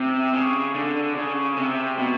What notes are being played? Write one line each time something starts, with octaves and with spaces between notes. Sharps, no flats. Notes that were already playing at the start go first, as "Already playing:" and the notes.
Already playing: C3
C#3
D3
C#3
C3
B2